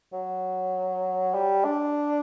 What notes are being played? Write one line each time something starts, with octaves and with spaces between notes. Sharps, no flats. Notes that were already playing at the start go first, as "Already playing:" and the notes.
F#3
G3
D4